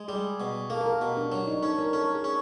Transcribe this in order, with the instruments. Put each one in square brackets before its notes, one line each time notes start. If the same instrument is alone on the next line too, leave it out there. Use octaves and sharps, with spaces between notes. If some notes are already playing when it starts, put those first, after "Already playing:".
Already playing: [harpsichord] G#3
[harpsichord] G3 [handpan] G#4
[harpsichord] B2
[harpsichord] A#3 [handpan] A4
[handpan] A#4
A4
[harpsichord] B2 [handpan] G4
[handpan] D4
[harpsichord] F#3 [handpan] D4
[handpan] D#4
[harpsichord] C#4 [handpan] A4
[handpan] A#4
[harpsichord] C#4 [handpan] A4
[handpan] G#4
[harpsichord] C#4